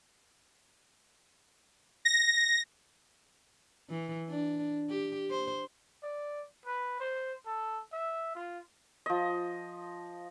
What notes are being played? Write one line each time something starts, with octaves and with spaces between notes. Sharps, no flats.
A#6
E3
D4
G4
C5
D5
B4
C5
A4
E5
F4
F3 D#5